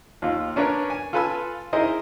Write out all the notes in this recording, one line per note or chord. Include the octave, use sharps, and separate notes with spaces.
D#2 F4
C#4 D4 A#4 B4 C#5
G#5
F4 A4 B4 G#5 B5 E6
D#4 E4 G#4 A#4 C5 D#5